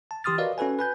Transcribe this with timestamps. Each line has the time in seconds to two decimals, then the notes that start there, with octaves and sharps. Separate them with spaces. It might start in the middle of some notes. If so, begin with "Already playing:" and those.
0.11 A5
0.24 E3 G4 C6 D#6 F6 A6
0.38 F#4 A#4 B4 D5 D#5 F5
0.58 C#4 F#4 A4 B4 G#5
0.79 B4 G#5 G6